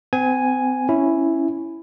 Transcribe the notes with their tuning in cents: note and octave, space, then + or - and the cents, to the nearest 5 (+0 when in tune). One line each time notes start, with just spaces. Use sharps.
C4 -40 G#5 +0
C#4 +0 E4 +0